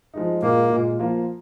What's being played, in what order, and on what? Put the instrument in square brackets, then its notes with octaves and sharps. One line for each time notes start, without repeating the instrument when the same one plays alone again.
[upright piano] F3 G#3 D#4
[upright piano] A#2 G#3 F4 [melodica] A#3
[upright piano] A#2 G#3 F4
F3 A#3 F4